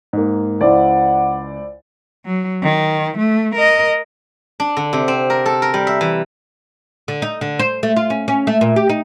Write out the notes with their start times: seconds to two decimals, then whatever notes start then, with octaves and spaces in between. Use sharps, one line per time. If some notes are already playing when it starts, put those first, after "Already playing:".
0.13 G#2 A#3
0.61 C#2 E4 C5 D5 F#5
2.25 F#3
2.63 D#3
3.17 A3
3.55 A#4 D#5
4.60 D4
4.77 D3
4.93 C3
5.08 C4
5.30 A#4
5.46 A4
5.62 A#4
5.74 G3
5.87 E5
6.01 E3
7.08 D3
7.22 D#4
7.41 D3
7.59 C5
7.83 A3
7.96 F4
8.10 C#4
8.28 C#4
8.47 A3
8.61 A#2
8.76 G4
8.89 D#4